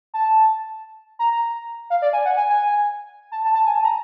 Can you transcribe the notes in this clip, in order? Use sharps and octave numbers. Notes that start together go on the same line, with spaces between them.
A5
A#5
F5
D5
G#5
F#5
G#5
G#5
A5
A5
A5
G#5
A5
A#5